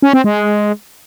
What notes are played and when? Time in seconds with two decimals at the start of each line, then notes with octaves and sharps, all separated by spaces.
0.02 C#4
0.13 C4
0.24 G#3